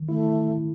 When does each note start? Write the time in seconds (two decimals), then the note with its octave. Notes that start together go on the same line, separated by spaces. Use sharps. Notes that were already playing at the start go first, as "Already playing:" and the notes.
Already playing: D#3
0.09 A3 E4